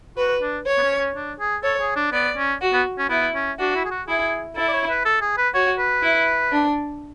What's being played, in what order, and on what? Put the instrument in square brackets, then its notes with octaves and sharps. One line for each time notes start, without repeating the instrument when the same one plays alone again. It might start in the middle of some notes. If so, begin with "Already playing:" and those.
[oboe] F#4 [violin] B4
[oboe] D4
[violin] C#5
[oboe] B3
C#4
C#4
D4
G#4
[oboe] A4 [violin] C#5
[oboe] G#4
D4
[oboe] B3 [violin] D5
[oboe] C#4
[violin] F#4
[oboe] B3
C#4
[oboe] B3 [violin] E4
[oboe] C#4
[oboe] D4 [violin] F#4
[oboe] E4
G#4
F#4
[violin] E4 [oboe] G#4
[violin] E4 [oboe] A4
[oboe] D5
C#5
B4
A4
G#4
B4
[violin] F#4 [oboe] C#5
[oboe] B4
[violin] E4
D4